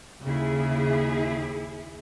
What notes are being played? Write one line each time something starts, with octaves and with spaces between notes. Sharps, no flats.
D#2 C#3 E4 G#4